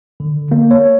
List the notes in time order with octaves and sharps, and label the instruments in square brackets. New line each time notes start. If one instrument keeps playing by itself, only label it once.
[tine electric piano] D3
A#3
C#5